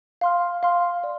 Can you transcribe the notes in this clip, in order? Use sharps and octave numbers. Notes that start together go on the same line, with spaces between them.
F5 C6 F6
F5 C6 F6
D5